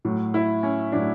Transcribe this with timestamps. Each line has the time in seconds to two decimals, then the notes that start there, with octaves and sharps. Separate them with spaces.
0.05 A2 F#3
0.34 E4
0.63 C#4
0.92 A2 F#3 D4